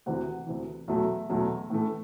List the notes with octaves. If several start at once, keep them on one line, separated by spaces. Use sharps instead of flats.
D2 C3 E3 F#5
D2 C3 E3
E2 B2 F#3 A3 E5
E2 B2 F#3 A3
A2 E3 A3